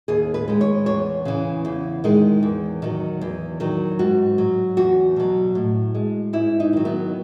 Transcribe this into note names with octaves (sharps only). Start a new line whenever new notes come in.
D#2 G#4
B4
D#3 G#3
C#5
E2 C#5
C#3 E3
E2
D#3 G#3
E2
D#3 F#3
E2
D#3 F#3
G#2 F#4
F#3
E2 F#4
B2 F#3
A2
G#3
G#2 E4
D#4
D#3 F#3
B3